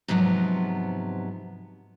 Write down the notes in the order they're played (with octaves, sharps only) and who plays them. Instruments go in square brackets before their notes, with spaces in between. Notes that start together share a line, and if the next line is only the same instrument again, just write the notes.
[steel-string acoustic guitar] G#2 C3 F3 F#3 B3